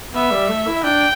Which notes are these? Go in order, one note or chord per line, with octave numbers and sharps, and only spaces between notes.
B3 E5
G3
A3
E4
D4 G5